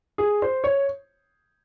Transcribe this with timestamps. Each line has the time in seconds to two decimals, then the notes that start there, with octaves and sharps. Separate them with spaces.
0.18 G#4
0.42 C5
0.64 C#5